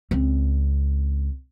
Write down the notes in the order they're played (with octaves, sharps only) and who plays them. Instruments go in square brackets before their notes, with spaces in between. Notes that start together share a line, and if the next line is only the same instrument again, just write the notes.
[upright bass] C#2 C4